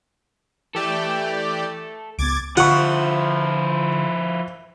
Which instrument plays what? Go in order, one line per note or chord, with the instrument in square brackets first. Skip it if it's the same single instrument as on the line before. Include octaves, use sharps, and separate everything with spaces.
[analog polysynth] E3 G4 D5 [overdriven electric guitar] A4 E5
[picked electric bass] C#2 B3 [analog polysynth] D6 G#6 A6
[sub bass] D3 [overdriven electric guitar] F3 E4 [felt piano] F4 C#6 [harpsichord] F#5